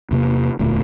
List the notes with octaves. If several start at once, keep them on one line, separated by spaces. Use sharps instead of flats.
E2 C3 A#3
E1 D2 A#2 A3